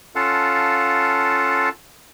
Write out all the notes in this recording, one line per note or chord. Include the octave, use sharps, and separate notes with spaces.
C#4 F4 A4 F5 F#5 A5